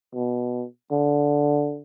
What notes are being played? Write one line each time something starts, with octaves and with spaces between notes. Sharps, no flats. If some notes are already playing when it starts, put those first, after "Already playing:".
B2
D3